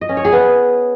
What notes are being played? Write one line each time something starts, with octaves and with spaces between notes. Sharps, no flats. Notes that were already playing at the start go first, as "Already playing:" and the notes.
D#5
C#4
C#5
G#4
B3